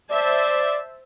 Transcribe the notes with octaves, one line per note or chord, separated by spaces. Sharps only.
C5 D5 E5 A5